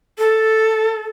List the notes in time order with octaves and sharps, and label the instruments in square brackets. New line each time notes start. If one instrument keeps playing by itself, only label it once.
[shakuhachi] A4